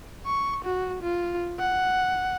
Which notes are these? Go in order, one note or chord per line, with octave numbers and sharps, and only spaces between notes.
C#6
F#4
F4
F#5